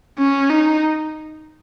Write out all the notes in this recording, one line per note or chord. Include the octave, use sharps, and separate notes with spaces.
C#4
D#4